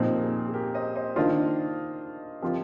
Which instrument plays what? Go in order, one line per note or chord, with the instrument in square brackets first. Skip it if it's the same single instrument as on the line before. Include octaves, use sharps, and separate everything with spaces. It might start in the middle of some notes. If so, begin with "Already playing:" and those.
Already playing: [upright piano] A#2 F3 C4 D#4 [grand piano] G4 A#4
[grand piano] A#4
G#4
G#4
G4 A#4
C5 D#5
C5 D#5
[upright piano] D#3 A#3 D4 F4 [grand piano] C5 D#5
[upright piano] F3 C4 F4 [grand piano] G4 A#4